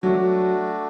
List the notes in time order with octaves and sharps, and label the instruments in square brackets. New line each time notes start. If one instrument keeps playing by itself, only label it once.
[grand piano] F#3 [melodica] A3 D4 F#4